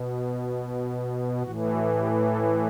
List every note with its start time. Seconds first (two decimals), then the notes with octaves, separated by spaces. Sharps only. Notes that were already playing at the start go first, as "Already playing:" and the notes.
Already playing: B2
1.42 A2 E3 F#4
1.71 F#4
1.99 G4
2.28 A4